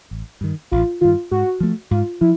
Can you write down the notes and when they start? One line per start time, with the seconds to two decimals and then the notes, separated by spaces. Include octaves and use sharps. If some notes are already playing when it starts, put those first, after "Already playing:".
0.11 A1
0.41 G2 D#3
0.71 A1 F4
1.01 G2 D#3 F4
1.31 G#2 F#4
1.60 F3 A3
1.91 G#2 F4
2.21 F3 E4